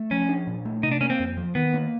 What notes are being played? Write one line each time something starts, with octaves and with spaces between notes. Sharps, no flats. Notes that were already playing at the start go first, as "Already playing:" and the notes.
Already playing: A3
F3 C#4
D4
A#2
A3
C3 D#4
D4
A#3 C#4
C4
F2
F3
D#3 B3
A#3